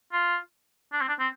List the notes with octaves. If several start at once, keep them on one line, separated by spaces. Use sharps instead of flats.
F4
D4
C4
D4
C4